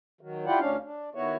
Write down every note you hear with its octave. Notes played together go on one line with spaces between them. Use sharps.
D#3 F#3
E4 F4 G4 D5 F#5
D2 C#4 D4 F5
D4
D#3 B3 E4 F#4 C#5